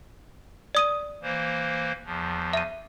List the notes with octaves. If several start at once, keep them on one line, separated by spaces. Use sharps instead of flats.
D5 D#6 D#7
E3 A#3 C5
E2 F3
E5 D#7